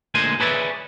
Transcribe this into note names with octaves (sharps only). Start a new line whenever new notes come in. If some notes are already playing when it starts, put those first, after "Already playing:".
D2 A#2 G#3 C5 G#5
G#4 B4 C#5 D5 E5